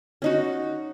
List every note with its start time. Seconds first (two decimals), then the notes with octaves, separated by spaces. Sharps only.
0.22 C#4 D#4 F#4